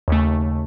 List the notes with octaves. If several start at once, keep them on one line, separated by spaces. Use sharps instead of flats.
D#2 C#3 A3